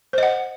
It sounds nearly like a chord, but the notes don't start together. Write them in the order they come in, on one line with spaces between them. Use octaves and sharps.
C5 D#5 F#5